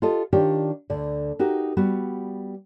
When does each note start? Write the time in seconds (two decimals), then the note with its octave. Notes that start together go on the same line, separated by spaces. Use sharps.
0.02 F4 G4 A4 D#5
0.33 D#3 D4 F4 G4 C#5 D5
0.90 D2 D3 D5
1.39 D#4 F#4 G4 A#4
1.77 G3 B3 F#4